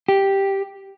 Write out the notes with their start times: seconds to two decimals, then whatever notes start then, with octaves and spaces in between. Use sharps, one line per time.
0.09 G4